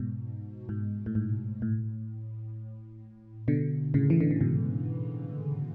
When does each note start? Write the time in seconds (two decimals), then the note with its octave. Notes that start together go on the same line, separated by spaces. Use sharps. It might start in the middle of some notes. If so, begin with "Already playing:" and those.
Already playing: G#2 B2
0.69 G#2
1.06 A2
1.15 G#2
1.62 A2
3.48 B2 D3
3.94 A2 C#3
4.10 E3
4.21 D3
4.31 C#3
4.41 G#2 B2